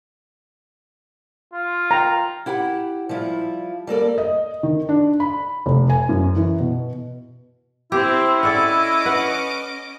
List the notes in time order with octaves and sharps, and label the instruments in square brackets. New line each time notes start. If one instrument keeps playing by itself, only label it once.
[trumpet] F4
[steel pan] G5 A#5
[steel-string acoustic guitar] E4 G4 F#5
F3 G3 E4 F4
G3 A#3 A4 D5
[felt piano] D#5
D#3
D4
B5
F1
G#5
F#2
E3
B2
[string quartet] C4 [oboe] E4 [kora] G4
[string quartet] C#4 D#5 D6 [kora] A4 D5 F#5
[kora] B4 F#5